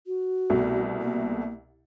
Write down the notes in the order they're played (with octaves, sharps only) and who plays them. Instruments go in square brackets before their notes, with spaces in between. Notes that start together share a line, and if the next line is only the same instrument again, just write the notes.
[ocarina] F#4
[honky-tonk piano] C2 B2 A3
[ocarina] A#3